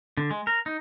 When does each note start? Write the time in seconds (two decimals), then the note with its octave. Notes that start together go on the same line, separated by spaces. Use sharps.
0.17 D3
0.31 G#3
0.47 A#4
0.66 D#4